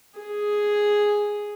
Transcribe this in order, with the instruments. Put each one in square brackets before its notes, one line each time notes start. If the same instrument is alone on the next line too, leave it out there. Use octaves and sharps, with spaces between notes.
[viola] G#4